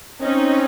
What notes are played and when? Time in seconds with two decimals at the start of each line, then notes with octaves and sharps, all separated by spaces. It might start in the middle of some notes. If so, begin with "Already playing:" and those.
0.21 C4 C#4 D#4